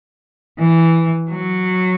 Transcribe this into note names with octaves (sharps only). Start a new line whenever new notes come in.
E3
F#3